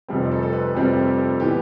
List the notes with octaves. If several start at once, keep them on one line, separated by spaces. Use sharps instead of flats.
F1 F2 C3 G3 C4
A4
A4
B4
F1 F2 C3 G3 C4 A4
G4
A4
A2 E3 B3 G4